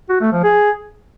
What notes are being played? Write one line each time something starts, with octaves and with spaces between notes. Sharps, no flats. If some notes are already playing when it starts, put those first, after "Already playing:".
F#4
A3
F3
G#4